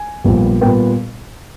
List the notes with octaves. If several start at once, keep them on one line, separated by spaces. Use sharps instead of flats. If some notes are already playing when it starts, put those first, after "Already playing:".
Already playing: G#5
A#1 A#2 G3 B3
A#2 G3 B3 G5